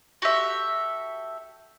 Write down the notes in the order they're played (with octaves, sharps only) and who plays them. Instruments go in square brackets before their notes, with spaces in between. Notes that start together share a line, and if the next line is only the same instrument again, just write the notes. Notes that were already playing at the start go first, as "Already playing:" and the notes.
[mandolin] F#4 G4 A4 E5